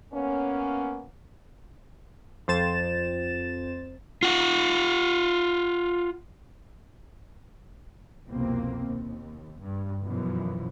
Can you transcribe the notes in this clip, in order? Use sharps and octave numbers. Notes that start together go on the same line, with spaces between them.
A#3 B3 C#4
F2 C5 A6 E7
F4 F#5
C2 F2 B2 A#3 C4
D#2
G2
F#2 B2 E3 F3